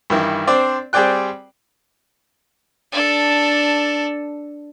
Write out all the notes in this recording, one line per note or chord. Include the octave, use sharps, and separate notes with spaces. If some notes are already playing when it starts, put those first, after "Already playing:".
G2 D#3 E3
C4 D4 C5 D5
G3 C4 G#4 D5 G5 F#6
D4 A4